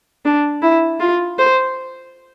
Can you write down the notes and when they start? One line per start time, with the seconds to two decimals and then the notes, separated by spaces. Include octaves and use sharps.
0.25 D4
0.62 E4
1.00 F4
1.38 C5